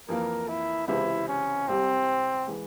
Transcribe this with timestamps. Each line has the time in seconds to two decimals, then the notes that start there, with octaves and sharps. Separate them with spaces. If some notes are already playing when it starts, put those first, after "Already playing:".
0.09 F2 E3 A#3 A#4
0.48 E4
0.88 C#2 C3 E3 G#3 C4 E4
1.28 C#4
1.68 C2 C3 G3 C4
2.47 E3 G#3